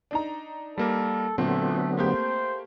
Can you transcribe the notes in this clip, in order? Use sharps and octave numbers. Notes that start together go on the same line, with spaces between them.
D4 D#4 A#5
G3 A#3 A4 A#4
A#2 D3 F#3 A3 B3 C4
A3 A#3 G4 C5